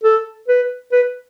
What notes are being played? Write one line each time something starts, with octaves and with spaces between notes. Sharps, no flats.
A4
B4
B4